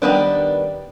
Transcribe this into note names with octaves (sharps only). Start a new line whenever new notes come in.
D#3 G3 B3 D4